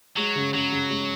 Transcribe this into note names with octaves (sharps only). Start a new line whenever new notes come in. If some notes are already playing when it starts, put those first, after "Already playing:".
F#3 G#3
C#3
C#3 F#3
C#3
G#3